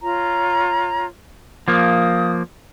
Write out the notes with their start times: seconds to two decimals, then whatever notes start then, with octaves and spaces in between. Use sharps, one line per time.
0.01 F4 C#5 A#5
1.68 F3 A#3 D#6